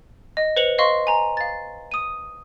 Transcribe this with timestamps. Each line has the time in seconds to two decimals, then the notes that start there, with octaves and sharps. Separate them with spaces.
0.37 D#5
0.56 B4 C5 C#7 F7 F#7
0.78 D#5 F5 C6 C#6
1.07 G#5 A#5
1.37 F5 A6
1.91 D#6 D#7